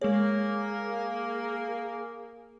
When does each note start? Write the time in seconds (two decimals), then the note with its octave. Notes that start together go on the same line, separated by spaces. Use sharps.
0.01 G#3 A#3 G#4 C#5